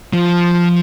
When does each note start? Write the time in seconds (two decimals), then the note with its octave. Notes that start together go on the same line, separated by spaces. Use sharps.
0.13 F3